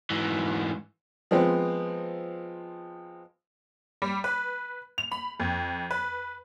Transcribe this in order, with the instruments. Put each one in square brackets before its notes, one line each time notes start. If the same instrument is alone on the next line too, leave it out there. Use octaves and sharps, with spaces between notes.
[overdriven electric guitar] G#2 E3
[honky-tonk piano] F3 G#3 B3 C4
G3
B4
F7
B5
F2
B4